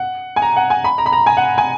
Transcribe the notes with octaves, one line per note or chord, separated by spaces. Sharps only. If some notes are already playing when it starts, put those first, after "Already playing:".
Already playing: F#5
G#5
A#5
F#5
G#5
B5
A#5
B5
A#5
G#5
F#5
G#5